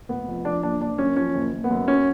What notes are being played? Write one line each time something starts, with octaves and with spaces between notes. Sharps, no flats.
F1 B3
F2
F3 D4
F#1 D4
F#1 D4
F#2 C#4
F3 C#4
F#1
F#1
B3
F#2
F#3 C#4